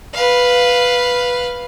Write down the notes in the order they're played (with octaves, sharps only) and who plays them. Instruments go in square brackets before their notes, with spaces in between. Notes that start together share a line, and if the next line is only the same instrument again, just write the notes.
[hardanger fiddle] B4 F5